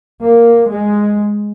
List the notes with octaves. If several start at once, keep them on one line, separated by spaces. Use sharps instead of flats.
A#3
G#3